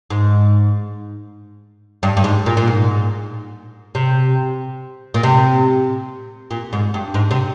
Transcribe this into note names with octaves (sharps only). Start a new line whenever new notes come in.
G#2
G2
G2
G#2
A#2
A#2
G#2
C3
A#2
C3
A#2
G#2
G2
G#2
C3